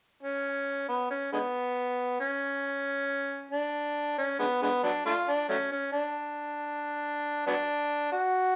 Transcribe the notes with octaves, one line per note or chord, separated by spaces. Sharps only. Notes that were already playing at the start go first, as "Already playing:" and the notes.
C#4
B3
C#4
D3 G#3 B3
C#4
D4
C#4
D3 G#3 B3
D3 G#3 B3
F#3 B3 D4
A3 D4 F4
D4
F#3 A3 C#4
C#4
D4
F#3 B3 D4
F#4